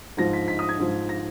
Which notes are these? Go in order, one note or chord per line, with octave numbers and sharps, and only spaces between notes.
G#2 F3 A#6
B6
B6
D#6
G#6
G#2 F3
A#6